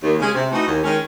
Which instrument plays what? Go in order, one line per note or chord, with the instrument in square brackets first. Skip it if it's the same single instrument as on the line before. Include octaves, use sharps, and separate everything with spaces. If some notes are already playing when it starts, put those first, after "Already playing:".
[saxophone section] D#2
C#3 G#3 C#4 G#4
C3
E3 A3 D#4 F#4
D#2
D#3 G#3 C#4